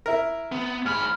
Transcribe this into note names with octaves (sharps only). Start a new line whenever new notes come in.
E4 A#4
B3
G#2 B5 F6